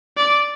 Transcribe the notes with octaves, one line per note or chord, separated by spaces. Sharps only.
D5